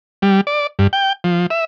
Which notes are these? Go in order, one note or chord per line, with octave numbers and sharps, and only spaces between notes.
G3
D5
G2
G5
F3
E5